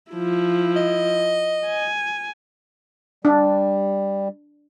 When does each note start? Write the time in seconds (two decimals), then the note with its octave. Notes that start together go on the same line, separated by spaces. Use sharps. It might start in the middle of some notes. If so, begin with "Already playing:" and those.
0.12 F3 E4
0.76 D#5
1.67 G#5
3.25 G3 D4